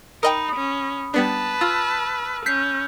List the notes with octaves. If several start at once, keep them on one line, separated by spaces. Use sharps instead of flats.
D#4 A#4 D#5 G5 B5 D#6
C#4
G3 B3 D4 B4 A5
F4 E6 F6
C#4 G6 B6 C7